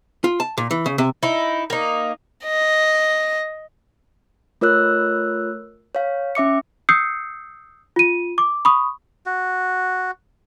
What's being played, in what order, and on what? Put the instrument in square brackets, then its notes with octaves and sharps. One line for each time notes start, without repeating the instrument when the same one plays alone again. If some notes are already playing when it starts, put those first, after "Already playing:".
[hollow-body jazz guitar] F4
A5
A#2
E3
C#3
C3
[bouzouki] D#4 E4
A#3 D#4
[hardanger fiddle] D#5
[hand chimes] A3 F4 A#4 C#5 E6 F#6
C#5 F5
C#4 E5 D6 C#7
[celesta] D#6 E6 G6 C7 C#7
F4 D#7
D6
B5 C#6 D#6
[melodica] F#4